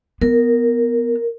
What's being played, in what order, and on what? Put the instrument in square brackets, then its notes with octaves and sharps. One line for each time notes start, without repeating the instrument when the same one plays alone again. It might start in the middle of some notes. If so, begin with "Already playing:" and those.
[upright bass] B3 [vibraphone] A#4